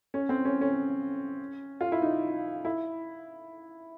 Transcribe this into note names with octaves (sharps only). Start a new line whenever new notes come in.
C#4
C4
C#4
C#4
F4
E4
D#4
E4